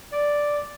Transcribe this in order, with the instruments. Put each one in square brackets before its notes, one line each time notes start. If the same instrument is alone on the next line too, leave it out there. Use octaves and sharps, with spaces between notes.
[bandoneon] D5